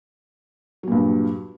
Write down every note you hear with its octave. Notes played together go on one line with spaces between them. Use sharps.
G2 A#2 F#3